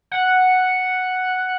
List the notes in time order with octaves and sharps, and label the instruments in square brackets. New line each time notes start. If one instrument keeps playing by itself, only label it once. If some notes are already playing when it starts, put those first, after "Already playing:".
[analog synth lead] F#5